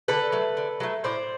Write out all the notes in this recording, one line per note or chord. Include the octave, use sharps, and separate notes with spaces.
D3 A4 B4
F#3 A3
D3
F#3 A3
A2 C5 D5